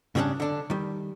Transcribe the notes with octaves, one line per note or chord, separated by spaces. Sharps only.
G#2 C#3 G3 B3 C#4 D4
D3 D4
D#3 G3